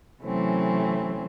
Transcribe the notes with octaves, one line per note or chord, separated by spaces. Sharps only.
C3 E3 F#3 A3 C4 C#4